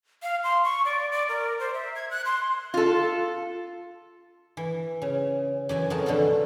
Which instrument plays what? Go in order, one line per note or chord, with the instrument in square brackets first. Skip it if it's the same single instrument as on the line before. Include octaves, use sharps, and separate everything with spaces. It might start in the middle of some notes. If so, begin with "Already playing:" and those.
[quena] F5
C6
C#6
D5
D5
A#4
C5
E5
G#6
F#6
C6
[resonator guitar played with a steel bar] F4 A4
[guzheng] E3
C#3
F#2 E3 G#5
F2 C#3 F#4 A#4 D#5 A5
B2 D3 A3 B3 F4